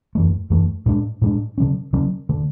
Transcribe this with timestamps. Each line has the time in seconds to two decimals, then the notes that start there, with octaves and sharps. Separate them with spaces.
0.15 F#2 E3 A3
0.50 F#2 E3 A3
0.86 A2 G#3 D4
1.22 A2 G#3 D4
1.58 C#3 F#3 C#4
1.93 C#3 F#3 C#4
2.29 D3 A3